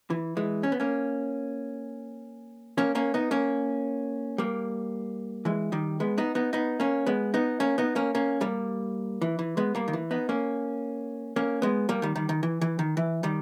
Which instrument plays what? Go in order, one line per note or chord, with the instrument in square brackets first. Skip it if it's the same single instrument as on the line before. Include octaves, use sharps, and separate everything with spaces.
[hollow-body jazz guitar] E3
E3 G#3
C#4
B3
A#3 C#4
A#3 C#4
A#3 C#4
B3 D#4
A#3 C#4
G3 A#3
E3 G#3
D#3 G3
G#3 B3
B3 D#4
B3 D#4
B3 D#4
A#3 C#4
G#3 B3
B3 D#4
A#3 C#4
B3 D#4
A#3 C#4
A#3 C#4
G3 A#3
E3
E3
G#3 B3
G3 A#3
D#3
E3
B3 D#4
A#3 C#4
A#3 C#4
G#3 B3
G3 A#3
D#3 G3
D#3 G3
D#3
E3
E3
D#3
E3
D#3 G3